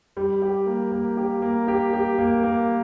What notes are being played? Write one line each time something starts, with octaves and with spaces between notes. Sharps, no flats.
G3
G4
A#3
A#3
G4
A#3
G4
G4
A#3
A#3